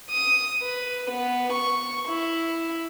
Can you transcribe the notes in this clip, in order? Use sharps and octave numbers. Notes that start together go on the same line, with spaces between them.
D#6
B4
B3
C#6
E4